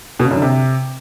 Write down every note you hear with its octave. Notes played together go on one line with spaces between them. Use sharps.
B2
C#3
F#2
D3
C3